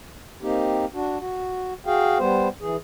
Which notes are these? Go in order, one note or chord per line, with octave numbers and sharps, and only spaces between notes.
A#3 C4 D#4 G4
D4 F#4
F#4
F#4 G#4 F5 G5
G3 B3 C5
E3 G#4